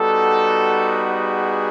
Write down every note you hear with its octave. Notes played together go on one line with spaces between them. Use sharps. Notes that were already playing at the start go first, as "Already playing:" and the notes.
Already playing: G3 B3 D#4 F#4 A4
G#4